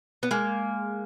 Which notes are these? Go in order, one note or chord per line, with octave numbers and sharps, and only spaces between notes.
B3
G#3 A#3